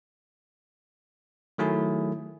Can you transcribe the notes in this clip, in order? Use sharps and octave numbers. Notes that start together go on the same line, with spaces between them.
D#3 F#3 A3 E4 G#4